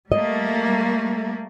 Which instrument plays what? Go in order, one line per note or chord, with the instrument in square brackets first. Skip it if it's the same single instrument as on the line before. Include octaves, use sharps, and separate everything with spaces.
[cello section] G3 A3 A#3 [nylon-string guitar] D#5